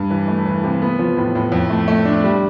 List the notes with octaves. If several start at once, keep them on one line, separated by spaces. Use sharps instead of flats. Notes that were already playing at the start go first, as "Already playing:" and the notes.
Already playing: G2
E3
A3
E3
C3
B3
F3
A2
A2
F2
A3
A3
D4
G3